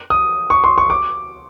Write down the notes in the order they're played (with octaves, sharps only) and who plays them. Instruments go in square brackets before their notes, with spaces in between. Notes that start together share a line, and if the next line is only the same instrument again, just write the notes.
[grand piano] D#6
C#6
C6
C#6
D6